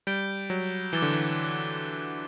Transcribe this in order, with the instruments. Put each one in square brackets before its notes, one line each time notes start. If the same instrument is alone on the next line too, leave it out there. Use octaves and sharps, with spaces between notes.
[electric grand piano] G3 [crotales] G6 D7 G7
[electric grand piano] F#3
[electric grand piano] E3 [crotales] D6 F#6 A6 E7 G7
[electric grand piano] D3
E3